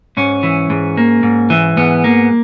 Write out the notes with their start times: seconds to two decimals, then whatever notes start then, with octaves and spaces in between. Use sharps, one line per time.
0.17 G#2 C#4
0.43 E3
0.70 G#2
0.97 A#3
1.23 G#2
1.50 E3
1.77 G#2 B3
2.04 A#3